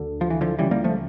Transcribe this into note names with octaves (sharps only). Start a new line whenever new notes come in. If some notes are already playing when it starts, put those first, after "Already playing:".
Already playing: D2 D3
F3
E3
D3 F3
C#2 C#3 E3 G3
G3 A#3
F3 A3